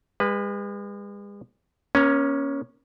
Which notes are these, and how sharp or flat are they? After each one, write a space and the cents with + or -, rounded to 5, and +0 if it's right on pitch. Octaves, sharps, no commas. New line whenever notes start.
G#3 -40 B4 +0
A#3 +40 C#4 +0 A#5 +0